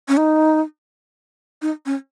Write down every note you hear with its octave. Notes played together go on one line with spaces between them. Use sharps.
C#4
D#4
D#4
C#4